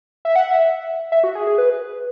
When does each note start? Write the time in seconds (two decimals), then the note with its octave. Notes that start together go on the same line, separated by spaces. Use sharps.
0.25 E5
0.36 F#5
0.51 E5
1.12 E5
1.24 F#4
1.35 G#4
1.47 G#4
1.58 B4